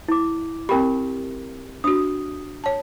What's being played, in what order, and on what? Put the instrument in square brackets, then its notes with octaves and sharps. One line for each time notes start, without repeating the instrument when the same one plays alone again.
[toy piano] E4 D6
[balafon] C4 G5 B5 [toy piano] G4 A#4
[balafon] D4 F#4 [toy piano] D#6
[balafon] C#5 A5